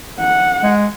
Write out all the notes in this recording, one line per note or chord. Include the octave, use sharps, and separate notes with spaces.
F#5
G#3